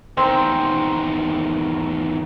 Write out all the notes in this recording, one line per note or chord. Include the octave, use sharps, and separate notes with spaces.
E2 D#3 C4